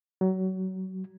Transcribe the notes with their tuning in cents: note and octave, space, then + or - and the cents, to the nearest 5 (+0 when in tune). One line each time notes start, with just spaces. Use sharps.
F#3 +25